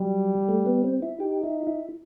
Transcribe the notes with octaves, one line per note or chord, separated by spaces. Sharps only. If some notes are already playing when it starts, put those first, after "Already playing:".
Already playing: F#3 G3
A3
B3
C4
E4
D#4 G4
E4
E4